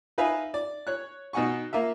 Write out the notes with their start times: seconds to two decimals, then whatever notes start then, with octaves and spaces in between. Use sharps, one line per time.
0.18 D#4 B4 E5 F5 G#5
0.54 D5
0.87 C#5 F#6
1.33 B2 D#4 F#5 G#5 C#6
1.73 A#3 F4 E5